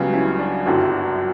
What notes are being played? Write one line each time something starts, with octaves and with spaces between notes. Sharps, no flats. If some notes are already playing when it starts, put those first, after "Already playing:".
Already playing: C#2 C#3 F#3 G3 B3
C#4 E4
D4 F#4
G1 F#2 D3 F#3 E4 G4
D4 F#4